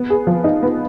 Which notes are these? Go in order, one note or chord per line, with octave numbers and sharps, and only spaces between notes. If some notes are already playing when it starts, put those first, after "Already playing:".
Already playing: B3
G#4
F3
D#4
B3